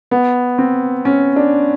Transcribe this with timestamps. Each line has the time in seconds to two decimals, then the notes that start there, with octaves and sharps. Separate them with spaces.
0.11 B3
0.58 C4
1.05 C#4
1.36 D4